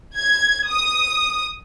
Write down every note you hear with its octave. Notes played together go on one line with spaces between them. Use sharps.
G#6
D#6